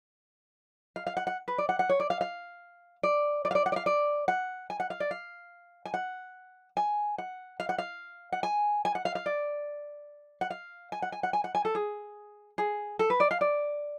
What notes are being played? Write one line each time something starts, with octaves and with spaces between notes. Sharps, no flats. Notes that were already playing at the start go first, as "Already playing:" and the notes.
F5
F5
F#5
F#5
B4
D5
F#5
F#5
C#5
D5
F5
F5
D5
D5
F5
D5
F#5
D5
F5
D5
F#5
G#5
F#5
F5
D5
F5
G#5
F#5
G#5
F#5
F5
F#5
F5
F#5
G#5
G#5
F#5
F5
F5
D5
F#5
F5
G#5
F#5
G#5
F#5
G#5
F#5
G#5
A4
G#4
G#4
A4
B4
D5
F5
D5